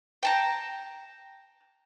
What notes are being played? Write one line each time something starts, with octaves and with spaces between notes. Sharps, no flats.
G5 A5 A#5